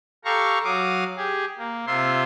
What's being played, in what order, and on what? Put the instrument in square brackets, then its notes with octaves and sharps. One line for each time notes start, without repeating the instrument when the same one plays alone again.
[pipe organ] G4 A4 F5 A#5 C#6
F#3 F5 D6 D#6
G4 G#4
A#3
C3 F4 E5 C6